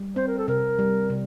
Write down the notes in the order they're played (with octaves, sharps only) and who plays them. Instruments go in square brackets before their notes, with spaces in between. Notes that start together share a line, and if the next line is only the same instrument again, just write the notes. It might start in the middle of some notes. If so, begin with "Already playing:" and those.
Already playing: [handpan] G3
[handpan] C4 [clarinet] C5
[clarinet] A#4
A4
[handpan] C3 [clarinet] A#4
[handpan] G3
C3